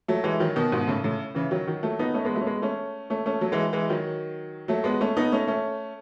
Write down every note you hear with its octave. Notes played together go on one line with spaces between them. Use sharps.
F#3 A3
E3 G#3
D#3 F#3
B2 D#3
G#2 B2
A2 C#3
A2 C#3
C#3 E3
D#3 F#3
D#3 F#3
F#3 A3
B3 D#4
A3 C#4
G#3 B3
F#3 A3
C#4
G#3 B3
A3 C#4
A3 C#4
A3 C#4
F#3 A3
E3 G#3
E3 G#3
D#3 F#3
F#3 A3
G#3 B3
A3 C#4
B3 D#4
A3 C#4
A3 C#4